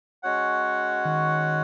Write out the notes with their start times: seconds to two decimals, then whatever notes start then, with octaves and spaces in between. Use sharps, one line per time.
0.23 G#3 C#4 F#4 C#5 F#5
1.05 D#3